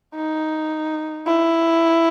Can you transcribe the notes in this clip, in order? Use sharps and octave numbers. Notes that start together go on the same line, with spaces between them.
D#4
E4